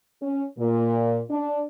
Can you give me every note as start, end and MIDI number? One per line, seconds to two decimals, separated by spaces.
0.21 0.43 61
0.58 1.19 46
1.30 1.61 62